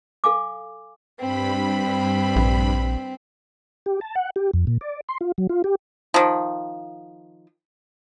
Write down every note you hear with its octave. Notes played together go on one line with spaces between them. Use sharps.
A4 F5 G#5 D6
G2 C4 B5
A#1
G4
A5
F#5
G4
F2
A#2
D5
C6
F4
F#3
F4
G4
D#3 F3